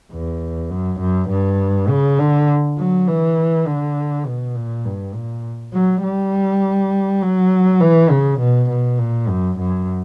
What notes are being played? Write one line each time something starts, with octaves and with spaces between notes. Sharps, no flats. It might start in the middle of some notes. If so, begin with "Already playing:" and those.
E2
F#2
F#2
G2
C#3
D3
F#3
E3
D3
B2
A#2
G2
A#2
F#3
G3
F#3
E3
C#3
B2
B2
A#2
F#2
F#2